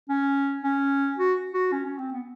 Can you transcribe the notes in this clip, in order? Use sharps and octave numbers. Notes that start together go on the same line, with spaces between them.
C#4
C#4
F#4
F#4
C#4
C#4
C4
B3